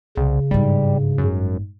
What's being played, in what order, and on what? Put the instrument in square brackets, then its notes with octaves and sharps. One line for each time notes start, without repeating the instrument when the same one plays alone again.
[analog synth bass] C2 [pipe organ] C#3
[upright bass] G1 G#2 [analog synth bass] G3
[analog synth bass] F#2